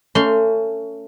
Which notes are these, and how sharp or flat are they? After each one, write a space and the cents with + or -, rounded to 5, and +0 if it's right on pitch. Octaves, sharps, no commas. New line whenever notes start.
A3 +30 C#4 +20 C6 +0